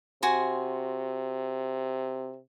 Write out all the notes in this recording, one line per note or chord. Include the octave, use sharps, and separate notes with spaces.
C3 F#4 G#5 C6